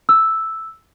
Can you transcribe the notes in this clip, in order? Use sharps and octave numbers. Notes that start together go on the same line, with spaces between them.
E6